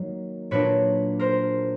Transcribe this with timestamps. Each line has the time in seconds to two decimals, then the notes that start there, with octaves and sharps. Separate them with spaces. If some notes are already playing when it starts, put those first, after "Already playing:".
Already playing: D#3 F#3 A#3
0.51 A#2 F#3 A#3 D4 B4 C#5
1.19 A#4 C5